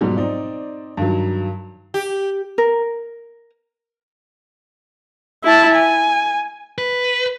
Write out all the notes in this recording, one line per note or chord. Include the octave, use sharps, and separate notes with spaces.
G#2 B2 F#3 G3
C4 D#4 D5
G2 D#3 F#3
G4
A#4
E4 A5
G#5
B4